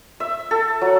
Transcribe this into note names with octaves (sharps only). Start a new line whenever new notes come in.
E5
A4
F#3